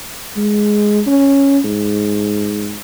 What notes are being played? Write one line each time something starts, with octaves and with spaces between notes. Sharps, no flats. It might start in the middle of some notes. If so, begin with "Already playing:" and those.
G#3
C#4
G#2